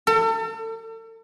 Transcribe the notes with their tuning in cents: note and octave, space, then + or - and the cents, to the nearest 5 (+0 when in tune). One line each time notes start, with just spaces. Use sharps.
A4 +40